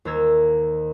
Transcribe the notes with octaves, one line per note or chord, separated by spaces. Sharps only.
D#2 C5 A#5 E6 G#6